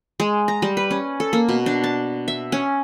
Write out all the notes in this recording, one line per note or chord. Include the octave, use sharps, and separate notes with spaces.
G#3
A#5
G3
B4
C#4
A4
A#3
B2
D4
A5
E5
C#4